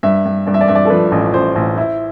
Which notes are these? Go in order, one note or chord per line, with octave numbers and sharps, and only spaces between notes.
G2 E5
G2
G2 D5
E5
D5
G2 E5
D5
A4
F3 B4
A1
A1 C5
A1
E4